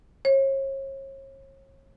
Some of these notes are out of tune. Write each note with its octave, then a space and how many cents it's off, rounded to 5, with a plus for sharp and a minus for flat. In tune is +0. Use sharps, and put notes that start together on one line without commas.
C#5 -40